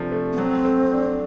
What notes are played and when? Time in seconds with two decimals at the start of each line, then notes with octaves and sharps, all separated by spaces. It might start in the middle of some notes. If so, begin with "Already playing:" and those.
Already playing: C3 F3 A3 D4
0.12 A3
0.33 B3
0.38 F#3 C4
0.65 A3
0.92 D4